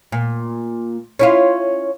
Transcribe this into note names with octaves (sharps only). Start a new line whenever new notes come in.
A#2
C#4 E4 F4